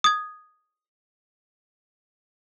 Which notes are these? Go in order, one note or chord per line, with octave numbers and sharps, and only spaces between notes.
D#6 G#6